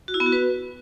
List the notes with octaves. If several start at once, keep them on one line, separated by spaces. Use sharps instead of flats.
F#4
E4
B3
F#4
B4